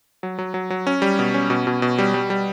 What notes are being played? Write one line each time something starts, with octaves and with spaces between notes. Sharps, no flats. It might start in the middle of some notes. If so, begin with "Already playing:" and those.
F#3
F#3
F#3
F#3
C#4
G3
B2
C#4
B2
B2
B2
G3
G3
G3